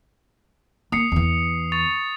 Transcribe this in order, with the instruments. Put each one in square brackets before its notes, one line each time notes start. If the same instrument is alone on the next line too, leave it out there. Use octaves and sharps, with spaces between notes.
[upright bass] A#3 [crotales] D#6 C7 C#7
[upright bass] E2 E3
[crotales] C#6 A6 F7